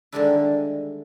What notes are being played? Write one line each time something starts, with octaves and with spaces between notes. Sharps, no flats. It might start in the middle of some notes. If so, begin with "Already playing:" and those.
D3 D#3 G3 G#3 D4 E4